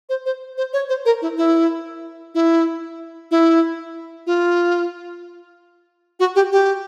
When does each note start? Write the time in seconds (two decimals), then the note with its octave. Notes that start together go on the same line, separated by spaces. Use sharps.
0.09 C5
0.26 C5
0.58 C5
0.73 C#5
0.89 C5
1.06 A#4
1.22 E4
1.38 E4
2.35 E4
3.31 E4
4.27 F4
6.20 F#4
6.35 G4
6.52 G4